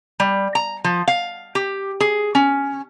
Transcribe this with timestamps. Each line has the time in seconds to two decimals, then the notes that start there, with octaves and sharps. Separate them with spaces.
0.20 G3
0.55 A#5
0.84 F3
1.08 F5
1.55 G4
2.00 G#4
2.35 C#4